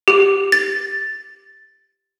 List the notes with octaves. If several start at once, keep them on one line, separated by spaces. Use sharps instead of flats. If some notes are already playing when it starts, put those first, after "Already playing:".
G4
A6